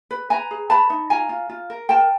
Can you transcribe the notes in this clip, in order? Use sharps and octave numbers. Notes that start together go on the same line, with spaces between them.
B4
B4 G#5 A#5
G#4
B4 A5 B5
D#4
F4 G#5 A#5
F4
F4
A#4
A#4 G5 A5